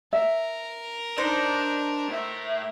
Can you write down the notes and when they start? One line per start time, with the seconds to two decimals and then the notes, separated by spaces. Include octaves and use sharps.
0.13 A#4 E5
1.18 D4 D#4 C5 D5
2.08 A2 E5